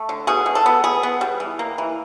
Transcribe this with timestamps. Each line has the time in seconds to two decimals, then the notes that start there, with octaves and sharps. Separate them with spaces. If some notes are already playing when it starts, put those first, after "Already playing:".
Already playing: A3
0.09 D3
0.27 B2 G#4
0.46 B2
0.55 A4
0.66 B3
0.84 B3 G#4
1.03 B3
1.21 G3
1.40 E3
1.59 A#3
1.78 E3